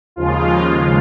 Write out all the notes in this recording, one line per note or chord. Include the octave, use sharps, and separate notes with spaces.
D#2 C#3 F3 G#3 F4